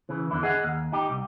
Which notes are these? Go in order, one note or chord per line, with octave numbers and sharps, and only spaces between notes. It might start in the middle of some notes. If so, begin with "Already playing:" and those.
C#3 E3
E2 D3 E3 E4
G#4 D#5 F#5
D#2
D#4 G4
C2